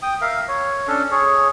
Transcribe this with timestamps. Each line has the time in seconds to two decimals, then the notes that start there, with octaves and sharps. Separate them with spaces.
0.02 G5 D#6
0.21 A#4 E5 F5
0.48 C#5
0.88 C#4 D4 A4
1.11 G#4 C#5